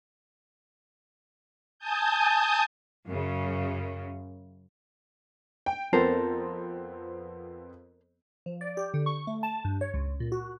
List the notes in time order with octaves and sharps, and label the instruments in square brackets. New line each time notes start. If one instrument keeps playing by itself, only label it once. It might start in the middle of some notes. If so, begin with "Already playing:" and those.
[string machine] G#5 A5 D#6 G6
[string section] F#2 C#3
[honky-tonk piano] G5
[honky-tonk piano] F2 B3 C4 [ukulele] A4 A#4 C5
[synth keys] F3
D5
G4
D3
C#6
A3
A5
G2
C#5
C#2
A#2
F#4